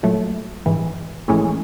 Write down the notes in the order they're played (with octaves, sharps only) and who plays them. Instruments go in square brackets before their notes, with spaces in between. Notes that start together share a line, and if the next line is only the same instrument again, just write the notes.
[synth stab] A#2 F#3 A3
A#1 G#2 E3
A#1 A2 E3 G#3 C#4